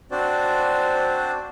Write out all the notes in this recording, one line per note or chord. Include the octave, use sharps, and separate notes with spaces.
C4 D4 F#4 C5 D5